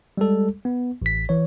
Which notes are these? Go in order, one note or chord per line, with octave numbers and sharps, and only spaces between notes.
G3 G#3 A4
B3
A1 B6
E3 C#5